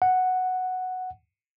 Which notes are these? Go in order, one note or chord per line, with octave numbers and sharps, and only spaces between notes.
F#5